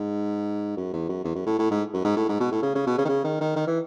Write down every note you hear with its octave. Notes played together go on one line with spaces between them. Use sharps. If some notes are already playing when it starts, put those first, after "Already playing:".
Already playing: G#2
F#2
E2
F#2
E2
F#2
A2
A2
G#2
F#2
G#2
A2
G#2
B2
A2
C#3
C#3
B2
C#3
D#3
C#3
D#3
D#3
D#3
E3